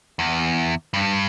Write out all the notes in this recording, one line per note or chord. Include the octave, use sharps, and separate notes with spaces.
E2
G2